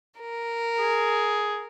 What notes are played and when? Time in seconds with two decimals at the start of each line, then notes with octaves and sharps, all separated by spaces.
0.21 A#4
0.80 G#4